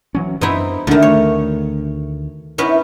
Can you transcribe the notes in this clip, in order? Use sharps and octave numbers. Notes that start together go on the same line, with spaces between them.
E3 F#3 C#4
F#2 B3 C4 D#4 E4
D2 D3 D#3 A3 C#4 D4 F#4
C#5
B3 C#4 D#4 E4 B4